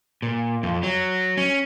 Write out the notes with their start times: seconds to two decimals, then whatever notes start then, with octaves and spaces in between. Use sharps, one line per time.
0.22 A#2
0.63 F2
0.83 F#3
1.37 C#4